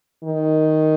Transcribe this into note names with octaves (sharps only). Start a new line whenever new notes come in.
D#3